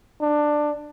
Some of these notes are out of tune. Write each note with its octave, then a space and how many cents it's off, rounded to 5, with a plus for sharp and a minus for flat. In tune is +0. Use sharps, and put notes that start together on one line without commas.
D4 +15